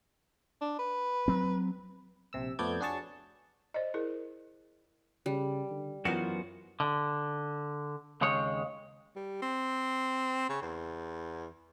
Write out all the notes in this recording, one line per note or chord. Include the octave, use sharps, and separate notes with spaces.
D4
B4
F#3 C4
A#1 C3 E6
F2 A3 B3 D5 G6 G#6
D4 F#4 G#4 C#5 A5 C#6
C5 D5 D#5
E4 G#4 A#4
C#3 G3
D3
F#2 E3 B3 F4 F#4 C5
D3
D#2 C#3 G#3 C4 C#5
G3
C4
C#3
E2